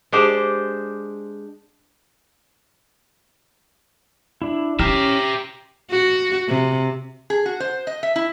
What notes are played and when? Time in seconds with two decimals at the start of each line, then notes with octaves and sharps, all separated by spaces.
0.12 G#3 D4 G4 C5
4.42 D4 E4
4.79 C#4 E4 G4 C5 E5 A#5 F6
5.91 F#4
6.48 C3
7.30 G#4
7.46 F#4
7.60 C5
7.87 D#5
8.03 E5
8.16 E4